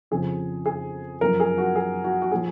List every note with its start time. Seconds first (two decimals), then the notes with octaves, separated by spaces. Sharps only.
0.11 F2 C#3 F3 G#4
0.66 G#4
1.21 F#2 F3 A#4
1.40 G#4
1.58 F#4
1.76 G#4
2.04 F#4
2.22 F#4
2.32 A#2 F3 G#4